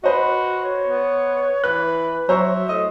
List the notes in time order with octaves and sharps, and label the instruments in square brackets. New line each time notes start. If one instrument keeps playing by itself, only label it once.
[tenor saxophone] F#4 [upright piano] B4 C5 D#5
[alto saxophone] C#5
[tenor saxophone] B3
[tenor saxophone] E3 [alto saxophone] B4 [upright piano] F#6
[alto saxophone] F#3 [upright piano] C5 A#5 C#6 [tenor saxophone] E5
[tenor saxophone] A2 [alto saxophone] D#5